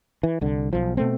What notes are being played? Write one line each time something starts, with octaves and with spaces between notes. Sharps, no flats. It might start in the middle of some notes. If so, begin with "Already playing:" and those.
E3
C2 D3
B1 F3
B2 A3 C4